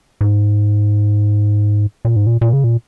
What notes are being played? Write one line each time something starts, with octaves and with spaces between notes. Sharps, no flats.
G#2
A#2
G#2
A#2
A#2
C#3
A#2